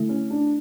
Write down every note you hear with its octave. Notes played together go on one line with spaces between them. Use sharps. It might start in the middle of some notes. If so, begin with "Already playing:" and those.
Already playing: D3 A3 E4
C#4
D4